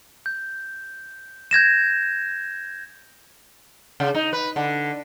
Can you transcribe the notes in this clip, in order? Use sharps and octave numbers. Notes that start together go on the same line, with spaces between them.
G6
G6 G#6 A#6 E7
C#3
D#4
B4
D3